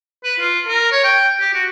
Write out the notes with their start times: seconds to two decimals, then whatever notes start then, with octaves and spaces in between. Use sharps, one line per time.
0.24 B4
0.40 F4
0.67 A#4
0.92 C#5
1.04 G5
1.41 G4
1.54 F#4